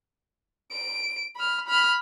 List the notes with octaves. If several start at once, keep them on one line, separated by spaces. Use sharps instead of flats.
D7
B5 F6
B5 F6